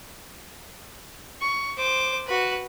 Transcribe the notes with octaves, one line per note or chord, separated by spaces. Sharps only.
C#6
C5 D6
F#4 B4